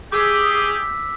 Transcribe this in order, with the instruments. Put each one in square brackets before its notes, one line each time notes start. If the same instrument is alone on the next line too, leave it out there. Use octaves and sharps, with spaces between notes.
[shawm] G4 [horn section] G#4 [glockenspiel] D6 E6 B6